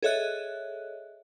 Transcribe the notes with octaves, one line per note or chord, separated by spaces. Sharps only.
G#4 A4 C#5 D#5 E5 F#6